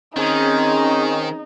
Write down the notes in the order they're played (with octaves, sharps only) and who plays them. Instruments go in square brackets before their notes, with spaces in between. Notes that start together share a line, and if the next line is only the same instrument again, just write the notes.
[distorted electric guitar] D#3 [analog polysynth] C4 C#4 G#4 [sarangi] D#4